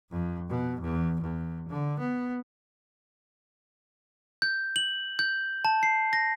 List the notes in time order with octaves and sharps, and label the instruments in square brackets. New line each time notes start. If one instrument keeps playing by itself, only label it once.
[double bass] F2
B2
E2
E2
D3
B3
[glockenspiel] G6
F#7
G6
A5
C7
A#6